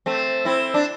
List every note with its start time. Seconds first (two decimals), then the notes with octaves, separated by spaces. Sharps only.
0.06 A3 C4
0.45 C4 E4
0.74 D4